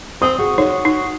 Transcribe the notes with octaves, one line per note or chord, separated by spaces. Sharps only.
C4 D#6
F#4 G#4
D#4 C#5
D#4